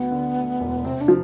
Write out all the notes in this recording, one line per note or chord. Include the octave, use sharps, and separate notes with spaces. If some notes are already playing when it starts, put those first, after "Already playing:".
Already playing: D2 B3
D3
A3
E1
C3 C4
D4
F3